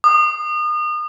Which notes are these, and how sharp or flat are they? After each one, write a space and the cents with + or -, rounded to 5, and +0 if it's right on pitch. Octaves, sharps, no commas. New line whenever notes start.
D#6 -35